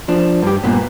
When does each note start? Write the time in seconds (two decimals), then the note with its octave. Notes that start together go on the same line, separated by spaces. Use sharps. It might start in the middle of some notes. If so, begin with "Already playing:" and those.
0.08 F3 D4
0.43 G2 G4
0.64 G2 A#2 B3